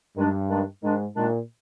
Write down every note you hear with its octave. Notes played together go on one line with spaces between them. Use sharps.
G2 D#3 G#3 D4
D#3 G#3 D4
G#2 D#3 G#3 D4
A#2 D#3 G#3 D4